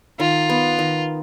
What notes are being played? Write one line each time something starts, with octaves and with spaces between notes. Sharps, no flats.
D#3 F4
B3
D#3